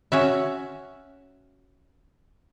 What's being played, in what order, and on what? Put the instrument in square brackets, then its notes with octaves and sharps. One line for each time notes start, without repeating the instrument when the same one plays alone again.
[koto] C#4 F#4 E5